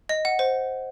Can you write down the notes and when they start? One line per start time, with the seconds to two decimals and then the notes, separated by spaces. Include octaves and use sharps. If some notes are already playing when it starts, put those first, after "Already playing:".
0.09 D#5
0.25 F#5
0.39 C5